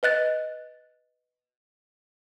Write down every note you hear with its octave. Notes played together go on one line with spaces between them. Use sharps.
B4 D#5 F#6 A6